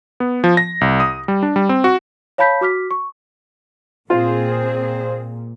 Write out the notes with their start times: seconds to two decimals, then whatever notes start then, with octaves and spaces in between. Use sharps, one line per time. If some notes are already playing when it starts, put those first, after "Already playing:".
0.20 B3
0.44 F3
0.57 A#6
0.81 C2
1.00 D#6
1.28 G3
1.43 D4
1.56 G3
1.69 C4
1.84 F#4
2.38 C#5 F5 A5 B5 G6 B6
2.61 F#4 D6 F6 B6
2.91 C#6
4.10 A#2 C4 F4 G#4 C5